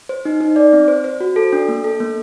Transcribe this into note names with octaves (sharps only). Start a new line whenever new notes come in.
C5
D#4
D#4
D5
C4
C5
C5
F#4
A4
D4
A#3
A4
A#3